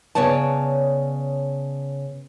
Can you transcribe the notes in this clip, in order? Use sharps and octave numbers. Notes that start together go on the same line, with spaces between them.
C#3 B3 C#5 D5 A5